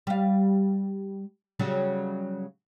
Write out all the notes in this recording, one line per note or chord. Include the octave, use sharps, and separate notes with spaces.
G3 F5
C#3 F#3 G3